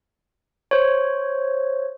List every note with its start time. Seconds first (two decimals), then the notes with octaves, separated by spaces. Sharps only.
0.71 C5 C#5